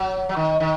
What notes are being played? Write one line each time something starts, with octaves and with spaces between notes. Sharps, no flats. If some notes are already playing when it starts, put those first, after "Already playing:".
Already playing: F#3
F#3
D#3
D#3